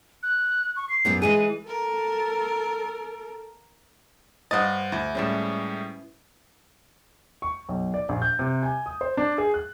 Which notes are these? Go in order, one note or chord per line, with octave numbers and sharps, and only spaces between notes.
F#6
C#6
C7
F#2 B3 G4
E3 G#3 G#4 D#7
A4 A#4
G2 C5 D#5 F#5 C6 A6
D2 E4
A2 G3 G#3 C#4 B4 A5
C#6
B1
D5
A#1
G6
C3
G#5
D#6
C5
D4
G#4
F#6